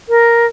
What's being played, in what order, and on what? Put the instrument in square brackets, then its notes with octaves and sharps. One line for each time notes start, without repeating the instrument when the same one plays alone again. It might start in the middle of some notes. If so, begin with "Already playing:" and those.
[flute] A#4